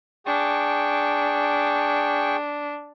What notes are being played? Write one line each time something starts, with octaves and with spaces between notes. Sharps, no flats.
D4 G#4 G5 C#6